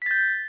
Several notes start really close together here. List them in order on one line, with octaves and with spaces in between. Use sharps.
B6 A6 G6